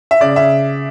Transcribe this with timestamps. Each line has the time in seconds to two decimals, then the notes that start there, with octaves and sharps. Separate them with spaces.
0.11 E5
0.20 C#3 D5
0.36 C#3 E5